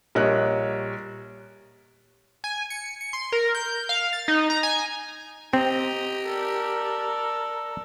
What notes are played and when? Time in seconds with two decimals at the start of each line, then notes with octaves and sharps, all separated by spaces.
0.15 A#1 G3 A#4 C#5 D#5 F#6
2.44 G#5
2.70 C#7
3.01 C#7
3.13 C6
3.32 A#4
3.55 G6
3.89 F5
4.13 A6
4.28 D#4
4.50 A#5
4.63 G#5
5.53 C4 G4 D#5 A#5
6.25 A4 A#4 D5